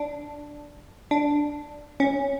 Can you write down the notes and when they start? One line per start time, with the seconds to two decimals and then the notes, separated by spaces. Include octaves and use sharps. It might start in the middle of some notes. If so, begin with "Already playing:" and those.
Already playing: D4
1.11 D4
2.00 C#4